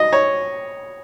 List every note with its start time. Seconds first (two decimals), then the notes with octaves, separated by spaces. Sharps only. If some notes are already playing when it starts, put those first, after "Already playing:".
Already playing: D#5
0.13 C#5